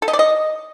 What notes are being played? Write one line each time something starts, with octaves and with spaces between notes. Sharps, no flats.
A4
D#5
D5
D#5